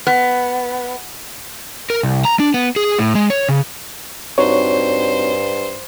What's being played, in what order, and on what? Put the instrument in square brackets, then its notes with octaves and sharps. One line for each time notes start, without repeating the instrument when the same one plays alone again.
[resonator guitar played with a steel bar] B3
[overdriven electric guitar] A#4
C2
A#5
D4
B3
G#4
A2
G#3
C#5
C#3
[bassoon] G2 [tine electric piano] C4 D#4 F#4 [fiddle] C5 [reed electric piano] C#5